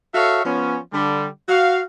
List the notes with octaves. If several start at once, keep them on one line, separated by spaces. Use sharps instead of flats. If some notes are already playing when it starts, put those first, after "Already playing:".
F#4 A4 C#5 E5 F5
F3 B3 C#4
D3 G3
F#4 F5